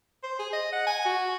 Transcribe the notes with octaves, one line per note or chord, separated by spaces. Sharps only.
C5
G#4
D#5
F#5
G#5
F#4